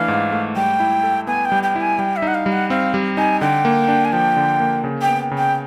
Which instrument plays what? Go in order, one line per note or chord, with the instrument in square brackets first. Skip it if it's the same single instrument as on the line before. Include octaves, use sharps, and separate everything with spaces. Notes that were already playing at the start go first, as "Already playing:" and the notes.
Already playing: [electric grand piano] E3 A3 D4 [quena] F5
[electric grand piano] G#2
A3
[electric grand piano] G3 [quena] G5
[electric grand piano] E4
A4
[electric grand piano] B3 [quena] G#5
[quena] G5
[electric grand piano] G3
[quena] G5
[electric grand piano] E4
[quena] G#5
[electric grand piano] G3 [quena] G5
[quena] E5
[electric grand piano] D#4
[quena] F#5
F5
[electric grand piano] G3
[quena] F#5
[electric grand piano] C4 [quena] F5
[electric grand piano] G3
[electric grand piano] D#4 [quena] G#5
[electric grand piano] D3 [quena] G5
[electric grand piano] A#3
D4
[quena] G#5
[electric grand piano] F3 [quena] G5
[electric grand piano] D3
A#3
C#3
[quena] G5
[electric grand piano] B3
C#3
[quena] G5